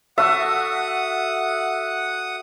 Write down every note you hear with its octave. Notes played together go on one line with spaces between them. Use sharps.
F#4 A4 E5 F#5 D#6